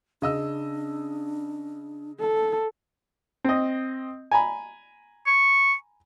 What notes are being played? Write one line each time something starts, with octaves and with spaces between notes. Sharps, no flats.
C#3 D4 D#5 E6
A4
C4 D#5
G#5 A#5 B5
C#6